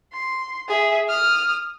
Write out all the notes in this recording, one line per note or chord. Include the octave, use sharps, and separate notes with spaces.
C6
G#4 E5
D#6 F6